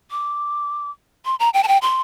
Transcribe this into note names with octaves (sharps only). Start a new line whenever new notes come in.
D6
C6
A#5
G5
A5
G5
C6